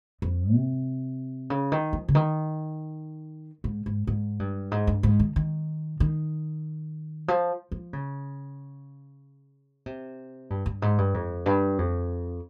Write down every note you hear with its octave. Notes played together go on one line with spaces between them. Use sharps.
F2
C3
C#3
D#3
F3
C#3
D#3
G#2
G#2
G#2
G2
G#2
G2
G#2
D#3
D#3
D#3
F3
F3
C#3
C3
G2
G2
G#2
G2
F2
G2
F2